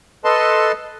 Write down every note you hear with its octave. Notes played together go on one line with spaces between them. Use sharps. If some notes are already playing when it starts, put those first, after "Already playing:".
A4 B4 D#5 A5 C6